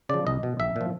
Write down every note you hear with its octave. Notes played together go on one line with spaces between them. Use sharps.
C#3 F3 D5
C2 D#5
B2
A#1 E5
A#2
F3